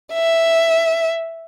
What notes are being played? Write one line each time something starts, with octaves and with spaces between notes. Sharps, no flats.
E5